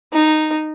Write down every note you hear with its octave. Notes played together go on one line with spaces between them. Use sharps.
D#4